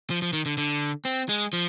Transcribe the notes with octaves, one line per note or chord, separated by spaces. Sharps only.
F3
F3
D#3
D3
D3
C4
G#3
F3